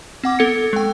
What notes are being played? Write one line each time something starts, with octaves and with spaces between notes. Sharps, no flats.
C4 F#5 D6
B3 A4 G#6 C#7
G#3 G5